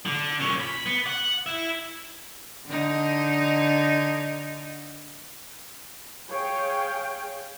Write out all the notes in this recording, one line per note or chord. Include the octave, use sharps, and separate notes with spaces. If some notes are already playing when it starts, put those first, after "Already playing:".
D3
A#2 C#4
B5
B3
F#5
E4 E5
D3 D#4
G#4 C#5 F5 G5